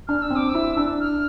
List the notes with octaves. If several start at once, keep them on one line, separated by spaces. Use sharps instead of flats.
D4 F6
E6
C4
D6
E6
E4
D4
F6